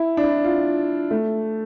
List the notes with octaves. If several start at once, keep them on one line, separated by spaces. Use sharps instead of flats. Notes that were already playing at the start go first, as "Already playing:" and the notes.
Already playing: E4
D4
E4
F4
A3